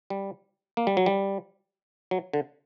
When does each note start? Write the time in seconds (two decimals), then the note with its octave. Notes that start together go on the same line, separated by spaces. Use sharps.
0.10 G3
0.77 A#3
0.87 G3
0.97 F#3
1.06 G3
2.11 F#3
2.33 D3